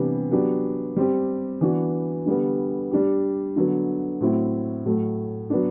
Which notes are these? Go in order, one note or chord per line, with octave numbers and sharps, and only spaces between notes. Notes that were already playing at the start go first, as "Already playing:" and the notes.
Already playing: C3 E3 G3 B3 D4
F#3 B3 D4 G4
G3 C4 G4
E3 B3 D4 F#4
D3 G3 B3
G3 D4 G4
D3 F#3 B3
A2 F#3 C4 E4
A2 F#3 A3
F#3 B3 D4